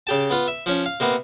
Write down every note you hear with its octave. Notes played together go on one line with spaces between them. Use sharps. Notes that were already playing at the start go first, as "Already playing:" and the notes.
C#3 G4 A5
B3 F4
E5
F3 C#4
F5
C3 A#3 B3